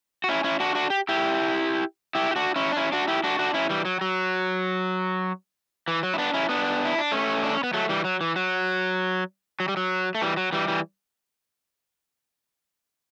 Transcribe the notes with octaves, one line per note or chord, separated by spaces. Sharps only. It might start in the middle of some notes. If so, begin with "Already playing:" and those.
F#4
C#4 E4
C#4 E4
D4 F#4
D4 F#4
G4
E4 G4
E4 G4
G4
D4 F#4
C#4 E4
D4
C#4 E4
D4 F#4
E4 G4
D4 F#4
D4 F#4
C#4 E4
E3 G3
F#3
F#3
E3
F#3
E4
B3 D4
C#4 E4
B3 D4
E4
D4
A3 C#4
D4
C#4
B3
F#3 A3
E3 G3
F#3
E3
F#3
F#3
G3
F#3
A3
E3 G3
F#3
E3 G3
E3 G3